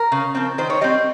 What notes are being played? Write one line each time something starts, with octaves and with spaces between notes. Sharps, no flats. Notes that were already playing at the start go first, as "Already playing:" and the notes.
Already playing: A#4
C#3
F3 C4
D#3 C5
C#5
G3 C4 D#5